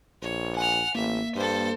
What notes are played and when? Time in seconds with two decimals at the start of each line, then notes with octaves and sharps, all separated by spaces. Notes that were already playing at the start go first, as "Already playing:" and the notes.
0.22 A#1 C#5
0.57 F#5 G#5 F6
0.95 A1 A#3 E5
1.36 G2 A4 C5